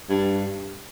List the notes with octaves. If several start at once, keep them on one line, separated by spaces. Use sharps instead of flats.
G2